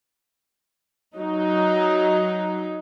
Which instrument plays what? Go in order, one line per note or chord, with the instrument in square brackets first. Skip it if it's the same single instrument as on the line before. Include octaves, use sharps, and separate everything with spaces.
[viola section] F#3 D#4